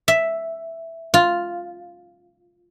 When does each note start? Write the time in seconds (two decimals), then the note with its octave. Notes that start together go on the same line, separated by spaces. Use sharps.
0.08 E5
1.14 F4